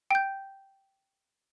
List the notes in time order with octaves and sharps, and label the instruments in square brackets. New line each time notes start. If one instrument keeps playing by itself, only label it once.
[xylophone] G5 G6